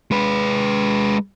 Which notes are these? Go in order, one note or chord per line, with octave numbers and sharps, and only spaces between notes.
G#3 B4